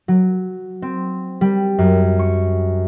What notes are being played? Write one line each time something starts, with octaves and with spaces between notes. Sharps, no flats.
F#3
C4
G3
F#2
C#6